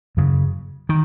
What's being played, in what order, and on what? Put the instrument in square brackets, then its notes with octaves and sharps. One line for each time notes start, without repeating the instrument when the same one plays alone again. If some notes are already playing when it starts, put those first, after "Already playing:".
[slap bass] F#2 C#3
D#3